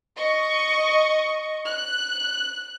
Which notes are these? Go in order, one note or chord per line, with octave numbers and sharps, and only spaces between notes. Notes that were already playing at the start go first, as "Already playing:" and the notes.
D#5 C#6
F#6